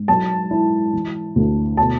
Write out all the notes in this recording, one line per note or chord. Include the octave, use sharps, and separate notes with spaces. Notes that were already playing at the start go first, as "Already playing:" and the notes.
Already playing: G#2
F#3 A5
E4
E3
D2
B2 A5